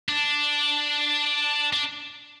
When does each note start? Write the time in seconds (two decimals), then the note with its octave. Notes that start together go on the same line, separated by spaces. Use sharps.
0.09 D4
1.73 D4